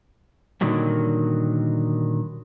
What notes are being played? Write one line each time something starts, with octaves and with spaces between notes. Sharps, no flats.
A#2 D3 D#3 F#3 G3